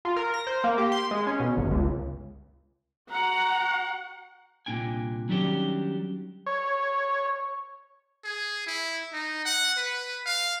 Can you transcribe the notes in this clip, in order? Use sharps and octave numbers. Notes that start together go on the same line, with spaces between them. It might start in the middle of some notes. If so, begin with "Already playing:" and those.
F4
A#4
A#6
C5
A#3
G4
C6
G#3
C#4
B2
G1
C#2
F#4 F#5 A#5
C2 A#2 D4 G5 G#5
D#3 F#3 G3 C#4 D4 G4
C#5
G#4
E4
D#4
F#5
B4
F5